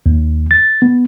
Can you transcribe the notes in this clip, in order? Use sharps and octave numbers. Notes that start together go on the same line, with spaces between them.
D#2
A6
B3